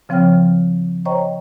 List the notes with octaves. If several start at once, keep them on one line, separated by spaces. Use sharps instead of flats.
C#3 F3 C4 C#5 G5 F6
C5 C#5 D#5 G5 A#5 C#6